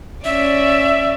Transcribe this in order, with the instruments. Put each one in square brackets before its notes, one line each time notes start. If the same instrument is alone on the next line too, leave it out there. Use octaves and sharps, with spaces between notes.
[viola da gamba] C#4 D5 [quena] E5